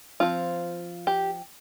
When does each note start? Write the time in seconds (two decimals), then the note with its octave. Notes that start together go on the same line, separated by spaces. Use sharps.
0.20 F3 C4 F4
1.07 G4